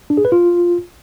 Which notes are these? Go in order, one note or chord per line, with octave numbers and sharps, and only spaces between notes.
D4
G#4
B4
F4